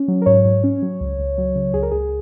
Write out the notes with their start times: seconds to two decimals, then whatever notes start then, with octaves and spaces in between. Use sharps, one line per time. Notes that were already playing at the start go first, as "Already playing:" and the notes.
Already playing: C#4
0.08 F#3
0.22 A#4
0.26 G#2 C#5
0.45 G#2
0.64 C#4
0.82 F#3
1.01 C#2
1.19 C#2
1.38 F#3
1.56 C#3
1.74 C#2 G#4
1.83 A#4
1.91 C#2 G#4